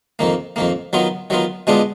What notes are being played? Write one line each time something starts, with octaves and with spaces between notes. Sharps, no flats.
F2 D#3 A#3
F2 D#3 A#3
D#3 F#3 B3 F4
D#3 F#3 B3 F4
B2 G#3 B3 D4 F4